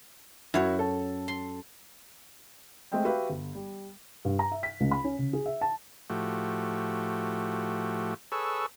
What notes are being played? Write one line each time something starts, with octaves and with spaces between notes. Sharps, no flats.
F#2 E4 F#4 C#5
A4
C6
G#3 A3 C4 D#5 G5
F#4 G4 B4 E5 F5 G5
G1
G3
G2
A#5
E5
B6
C#2
B5
C#4
C#3
G#4
E5
A5
A2 F3 A3 F#4 G4
G#4 A4 B4 C#5 C#6 E6